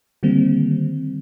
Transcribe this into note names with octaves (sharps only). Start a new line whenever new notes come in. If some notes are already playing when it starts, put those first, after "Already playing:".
D3 D#3 G3 A#3 C4